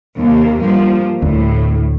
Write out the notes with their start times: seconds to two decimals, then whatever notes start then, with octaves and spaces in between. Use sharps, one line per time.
0.18 D#2 C3 A#3
0.60 G2 F3 A#3
1.22 D2 A2